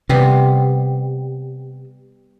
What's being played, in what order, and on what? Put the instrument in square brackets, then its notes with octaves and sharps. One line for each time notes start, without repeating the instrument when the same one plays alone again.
[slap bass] C3 [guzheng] G3 B3 G4